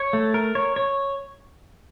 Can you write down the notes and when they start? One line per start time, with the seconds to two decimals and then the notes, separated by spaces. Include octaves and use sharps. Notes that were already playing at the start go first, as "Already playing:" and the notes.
Already playing: C#5
0.13 A3
0.34 A#4
0.55 C#5
0.76 C#5